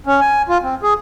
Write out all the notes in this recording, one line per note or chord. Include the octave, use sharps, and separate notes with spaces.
C#4
G#5
F4
C4
G#4